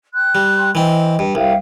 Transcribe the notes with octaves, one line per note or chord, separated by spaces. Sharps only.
G5 C6 F#6
G3
E3 C4 D#5
G2
C2 E5 F5 G5